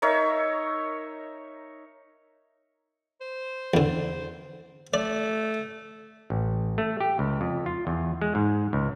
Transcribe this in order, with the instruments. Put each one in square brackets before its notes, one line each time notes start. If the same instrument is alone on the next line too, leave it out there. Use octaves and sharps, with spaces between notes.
[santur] D#4 A#4 C#5 E5
[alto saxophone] C5
[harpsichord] E2 D3
[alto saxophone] A3 [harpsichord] D5
[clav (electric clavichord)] A1
A3
G4
C#2
F2
F4
E2
G#3
G#2
C#2